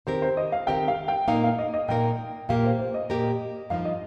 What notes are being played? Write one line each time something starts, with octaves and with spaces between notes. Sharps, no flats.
D#3 C4 G4 A#4 C5
C5
D#5
F5
D#3 C4 G4 A#4 G5
F5
G5
A#2 A#3 D#4 A#4 F5
F5
D#5
D#5
A#2 A#3 D#4 A#4 G5
A#2 A#3 G4 A#4 F5
C5
C5
D#5
A#2 A#3 G4 A#4
G2 F3 D#4 F5
D#5